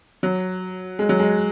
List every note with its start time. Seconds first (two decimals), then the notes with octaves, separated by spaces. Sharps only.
0.23 F#3
0.99 G#3
1.09 F#3
1.20 G#3